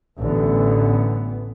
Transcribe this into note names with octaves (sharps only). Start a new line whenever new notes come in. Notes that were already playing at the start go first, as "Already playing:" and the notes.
A1 D3 E3 B3